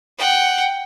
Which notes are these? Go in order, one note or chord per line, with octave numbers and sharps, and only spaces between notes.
F#5 G5